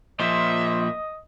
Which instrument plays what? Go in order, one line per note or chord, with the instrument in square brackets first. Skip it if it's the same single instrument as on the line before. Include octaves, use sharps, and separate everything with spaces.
[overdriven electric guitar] A#2 F3 [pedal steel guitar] C5 [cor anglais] D#5 [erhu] E5